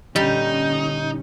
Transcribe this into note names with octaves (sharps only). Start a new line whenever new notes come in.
A#2 D3 G3 C#4 D#4